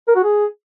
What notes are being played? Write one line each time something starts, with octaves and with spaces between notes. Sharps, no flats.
A#4
F#4
G#4